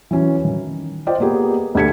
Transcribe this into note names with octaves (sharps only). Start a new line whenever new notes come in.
E3 F#3 C#4
D#3
F4 C5 D5 D#5 G5
A#3 B3 G4 G#4
D2 D4 G4 G#6 B6 C#7